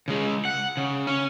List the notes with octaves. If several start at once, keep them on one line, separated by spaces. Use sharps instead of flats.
C#3 G#3
F#5
C#3
C#4